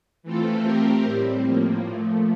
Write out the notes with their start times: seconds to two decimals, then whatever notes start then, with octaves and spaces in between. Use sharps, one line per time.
0.23 E3 A3 C4 F4 A4
0.64 A3 C4 G4 A#4
1.04 A2 G3 C4
1.44 A2 F3 A#3
1.84 A#2 F3 A3